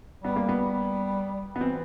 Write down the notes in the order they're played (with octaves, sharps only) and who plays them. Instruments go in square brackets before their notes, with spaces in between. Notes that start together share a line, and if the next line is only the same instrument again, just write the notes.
[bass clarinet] G3 [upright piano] B3
[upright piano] A#3
B3
B3
[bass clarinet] E3 [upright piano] C4